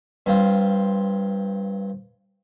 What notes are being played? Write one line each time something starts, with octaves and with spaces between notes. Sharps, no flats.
G2 C4 F4